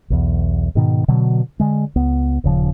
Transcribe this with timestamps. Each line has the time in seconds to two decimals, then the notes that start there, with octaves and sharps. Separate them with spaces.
0.10 B1 E2
0.75 G#2 B2 D#3
1.08 B2 D3 F#3
1.60 D3 G#3
1.96 C#2 B3
2.44 D#1 C#3 F3